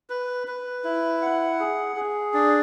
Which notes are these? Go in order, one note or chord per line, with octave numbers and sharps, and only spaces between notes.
B4
B4
E4
F#5
G#4
G#4
D4